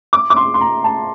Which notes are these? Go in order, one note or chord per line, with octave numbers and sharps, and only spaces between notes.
D6
D6
C6
C6
A#5
A5